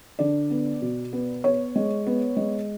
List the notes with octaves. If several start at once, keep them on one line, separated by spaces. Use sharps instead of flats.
D3 D5
B3
B2
B3
B3 C#5
G#3
B3
G#3